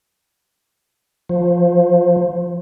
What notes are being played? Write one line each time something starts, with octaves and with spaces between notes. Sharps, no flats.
F3